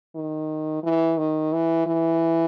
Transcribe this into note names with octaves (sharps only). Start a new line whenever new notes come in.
D#3
E3
D#3
E3
E3